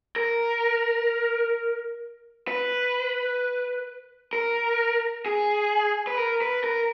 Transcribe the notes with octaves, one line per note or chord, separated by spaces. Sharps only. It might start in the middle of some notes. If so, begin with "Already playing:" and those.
A#4
B4
A#4
G#4
B4
A#4
B4
A#4